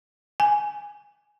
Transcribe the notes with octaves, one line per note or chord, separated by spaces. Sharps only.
G#5